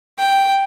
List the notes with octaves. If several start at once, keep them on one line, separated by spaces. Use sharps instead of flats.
G5